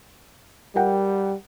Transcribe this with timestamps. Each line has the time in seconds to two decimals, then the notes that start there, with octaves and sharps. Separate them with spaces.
0.76 G3 A#4 F#5 G5